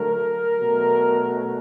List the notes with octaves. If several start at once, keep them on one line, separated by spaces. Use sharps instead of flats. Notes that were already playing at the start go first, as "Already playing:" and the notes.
Already playing: D3 F#3 A3 A#4
B2 F#3 A3